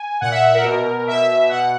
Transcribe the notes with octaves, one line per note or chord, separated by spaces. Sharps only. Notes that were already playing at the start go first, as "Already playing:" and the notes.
Already playing: G#5
A#2 F#5
E5
A#4
B2
B2 E5
B2 F#5